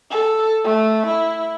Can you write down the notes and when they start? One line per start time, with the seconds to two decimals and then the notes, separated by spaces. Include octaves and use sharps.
0.11 A4
0.64 A3
1.07 E4